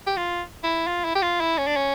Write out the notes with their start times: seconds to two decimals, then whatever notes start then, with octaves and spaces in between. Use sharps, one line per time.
0.07 G4
0.17 F4
0.64 E4
0.87 F4
1.05 E4
1.15 G4
1.22 F4
1.41 E4
1.58 C#4
1.67 D4
1.76 C#4